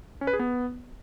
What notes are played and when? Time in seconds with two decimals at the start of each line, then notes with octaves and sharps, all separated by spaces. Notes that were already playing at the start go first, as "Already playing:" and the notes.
0.21 C#4
0.27 B4
0.33 G#4
0.39 B3